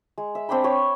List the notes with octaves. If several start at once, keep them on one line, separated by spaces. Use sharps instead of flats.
G#3
E5
C4 D4 G5 B5
C#5 G5 C#6